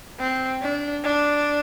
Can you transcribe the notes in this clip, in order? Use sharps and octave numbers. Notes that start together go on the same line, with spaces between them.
C4
D4
D4